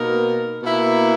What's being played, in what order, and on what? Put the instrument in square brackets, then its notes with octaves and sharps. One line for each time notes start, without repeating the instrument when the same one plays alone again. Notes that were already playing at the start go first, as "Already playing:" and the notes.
Already playing: [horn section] B2 A#3 D#4 A#4
B2 A#3 E4